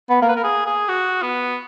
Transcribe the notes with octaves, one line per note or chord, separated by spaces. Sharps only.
B3
A#3 A#4
B4
A#4
G#4
G#4
F#4
B3